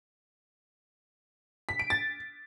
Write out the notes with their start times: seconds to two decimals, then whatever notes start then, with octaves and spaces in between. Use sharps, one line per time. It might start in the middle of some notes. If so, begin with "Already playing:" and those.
1.69 B6
1.79 D7
1.90 A6